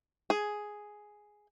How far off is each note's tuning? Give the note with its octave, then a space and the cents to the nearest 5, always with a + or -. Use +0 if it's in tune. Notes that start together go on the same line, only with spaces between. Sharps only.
G#4 +5